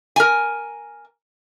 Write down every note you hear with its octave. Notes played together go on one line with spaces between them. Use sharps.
A#4 G#5